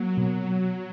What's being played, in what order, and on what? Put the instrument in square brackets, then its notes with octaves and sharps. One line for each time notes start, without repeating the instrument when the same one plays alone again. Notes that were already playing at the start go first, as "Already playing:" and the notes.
Already playing: [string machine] F#3 [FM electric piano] A#3
[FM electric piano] B2